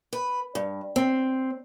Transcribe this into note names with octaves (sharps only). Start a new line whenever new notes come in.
B4
G2
C4